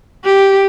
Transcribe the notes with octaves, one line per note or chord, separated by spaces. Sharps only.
G4